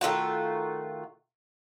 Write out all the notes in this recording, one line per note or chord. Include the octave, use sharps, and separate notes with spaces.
D#3 A3 F4 F#4